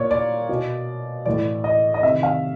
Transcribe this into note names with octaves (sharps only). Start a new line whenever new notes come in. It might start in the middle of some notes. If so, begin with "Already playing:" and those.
Already playing: A#2 C#5 D5
D5
B2
A2 E3 D5
D#5
D#5
C3 D#3 E5
F5